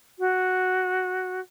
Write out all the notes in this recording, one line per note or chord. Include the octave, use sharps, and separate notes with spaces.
F#4